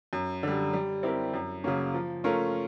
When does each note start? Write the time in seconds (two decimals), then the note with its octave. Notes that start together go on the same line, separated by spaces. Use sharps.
0.13 F#2
0.43 D3 G3
0.73 G3
1.03 C4 E4 G4 A#4
1.34 F#2
1.64 C#3 F#3 A#3 C#4
1.94 F3
2.24 A3 C#4 F4 A#4